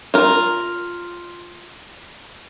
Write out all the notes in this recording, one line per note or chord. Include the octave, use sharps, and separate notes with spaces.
F4 A#4